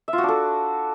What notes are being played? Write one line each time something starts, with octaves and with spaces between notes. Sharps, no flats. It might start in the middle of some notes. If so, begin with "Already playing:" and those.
E5
F4
F#4
D4
A4